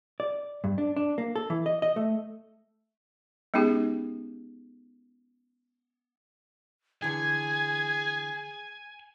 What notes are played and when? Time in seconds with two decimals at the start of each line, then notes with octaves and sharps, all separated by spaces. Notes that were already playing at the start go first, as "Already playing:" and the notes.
0.20 D5
0.64 G2
0.78 D4
0.96 D4
1.18 A#3
1.36 A4
1.50 E3
1.66 D#5
1.82 D#5
1.96 A3
3.54 G#3 B3 C#4 D#4 G4 G#4
7.02 D3 E3 G#4 G#5 G#6